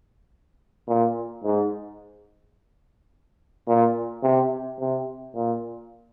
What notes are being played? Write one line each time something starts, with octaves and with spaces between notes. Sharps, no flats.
A#2
G#2
A#2
C3
C3
A#2